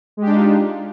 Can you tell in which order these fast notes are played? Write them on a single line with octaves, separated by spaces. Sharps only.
G#3 G4 D4 D#4 F4